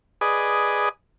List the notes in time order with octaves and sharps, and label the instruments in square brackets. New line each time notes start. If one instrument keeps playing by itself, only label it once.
[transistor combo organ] G#4 B4 D5 D#5